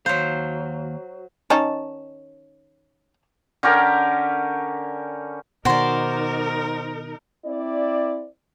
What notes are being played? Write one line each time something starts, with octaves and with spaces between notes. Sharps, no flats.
D#2 F#3 C5 F5
D#3 C#4 D#4 C#5 A5
D3 C#4 G4 A#4
B2 D#3 D#4 F#4 A#4 C5 D5 C6
C4 E4 D5